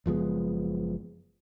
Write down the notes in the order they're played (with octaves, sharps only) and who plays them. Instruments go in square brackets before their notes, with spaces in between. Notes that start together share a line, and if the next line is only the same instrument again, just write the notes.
[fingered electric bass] F#1 F3 G#3 B3